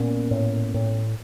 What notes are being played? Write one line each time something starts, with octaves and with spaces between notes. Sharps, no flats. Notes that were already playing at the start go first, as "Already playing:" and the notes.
Already playing: A#2 B3 C#4
A2
A2